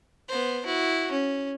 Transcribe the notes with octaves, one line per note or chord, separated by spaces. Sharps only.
B3 C5
E4 F#4
C#4